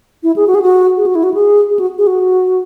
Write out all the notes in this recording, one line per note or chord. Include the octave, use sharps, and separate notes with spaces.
E4
G#4
F#4
G#4
F#4
G#4
F#4
E4
F#4
G#4
G#4
F#4
G#4
F#4